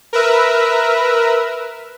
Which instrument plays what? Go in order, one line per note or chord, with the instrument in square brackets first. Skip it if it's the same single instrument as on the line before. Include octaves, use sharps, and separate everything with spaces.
[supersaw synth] A#4 B4 E5